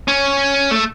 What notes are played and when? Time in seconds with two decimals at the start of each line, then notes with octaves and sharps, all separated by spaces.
0.08 C#4
0.71 A3